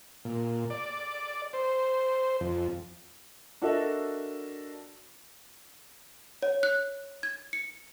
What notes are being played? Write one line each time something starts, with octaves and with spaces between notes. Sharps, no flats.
A#2
D5
C5
F2
D4 F#4 A4 A#4 D#5 E5
C#5
F#6
G#6
C#7